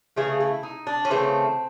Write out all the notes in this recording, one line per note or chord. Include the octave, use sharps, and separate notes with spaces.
C#3 E3 A3 G#4
E4
D#4
D4
C#4
C#3 E3 A3 C4